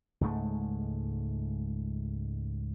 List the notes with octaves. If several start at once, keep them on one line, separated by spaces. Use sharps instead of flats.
C#2 G#2 G#3 A3